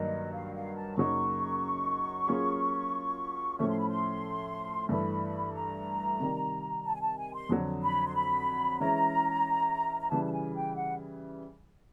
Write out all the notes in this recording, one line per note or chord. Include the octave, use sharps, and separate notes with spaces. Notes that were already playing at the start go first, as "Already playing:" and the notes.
Already playing: G2 D#3 F#3 A#3 D#5
F5
F5
A5
F#2 C#3 F#3 A#3 D#4 C#6
F#3 A#3 C#4 F4 G#4
A2 F3 A3 C#4 C#6
C6
B5
C6
G2 E3 A3 B5
A#5
C3 D#3 G3
A5
G#5
A5
G#5
C6
F2 D3 F#3
B5
C6
B5
E3 G#3 C#4 E4 A#5
A#5
C#3 E3 G3 A5
A5
G#5
G5
F#5